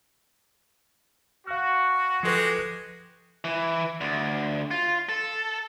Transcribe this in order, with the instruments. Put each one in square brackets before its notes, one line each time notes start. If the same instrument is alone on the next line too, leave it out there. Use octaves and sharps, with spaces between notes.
[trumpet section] F#4 [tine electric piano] F5 F6
[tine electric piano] F3 A4 B4 [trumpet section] G#3 F#4 G4
[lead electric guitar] E3
D2
F4
A4